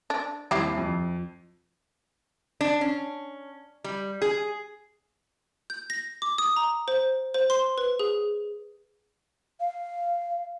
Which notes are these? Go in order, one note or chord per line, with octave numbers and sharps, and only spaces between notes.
D4
D#2 C3 G3 E4 G4 C7
F2
D4
C#4
G3
G#4
G6
A#6
D6
D#6
A#5
C5
C5
C6
B4
G#4
F5